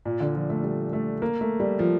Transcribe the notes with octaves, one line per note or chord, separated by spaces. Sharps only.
A#2
D3
F3
A3
G3
A3
A#3
A3
G3
F3